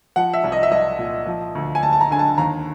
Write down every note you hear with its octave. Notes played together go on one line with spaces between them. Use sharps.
F3 F#5
E5
C2
D#5
E5
C2 D#5
A#2
F3
D2
G#5
D2 A5
A5
A#5
D3 G#5
A5
D#2 A#5